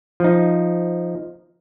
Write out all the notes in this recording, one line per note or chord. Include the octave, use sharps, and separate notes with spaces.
F3 D#4